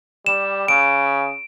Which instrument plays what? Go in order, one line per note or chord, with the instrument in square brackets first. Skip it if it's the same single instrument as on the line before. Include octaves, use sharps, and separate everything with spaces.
[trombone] G3 [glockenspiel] E7
[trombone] C#3 [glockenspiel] D7